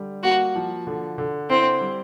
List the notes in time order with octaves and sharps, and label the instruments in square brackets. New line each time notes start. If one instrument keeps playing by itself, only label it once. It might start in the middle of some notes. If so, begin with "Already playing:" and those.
Already playing: [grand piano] D3 G3
[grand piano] A#3 [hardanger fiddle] F#4
[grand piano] F3
D3
D3
[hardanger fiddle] C4 [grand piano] E4
[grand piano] G3